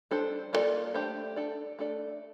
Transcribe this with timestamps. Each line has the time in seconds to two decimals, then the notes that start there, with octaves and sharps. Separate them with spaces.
0.11 G3 D4 A4 C5
0.53 A#3 D4 F4 A4 D5
0.94 A3 D4 G4 C5
1.36 D4 A4 D5
1.79 A3 D4 A4 D5